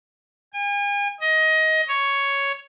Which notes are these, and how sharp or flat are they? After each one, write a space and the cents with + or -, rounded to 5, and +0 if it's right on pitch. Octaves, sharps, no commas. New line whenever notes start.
G#5 -40
D#5 +20
C#5 +5